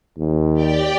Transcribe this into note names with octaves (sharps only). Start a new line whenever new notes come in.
D#2
G4 D5 G5